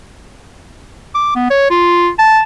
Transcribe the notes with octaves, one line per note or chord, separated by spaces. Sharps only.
D6
B3
C#5
F4
A5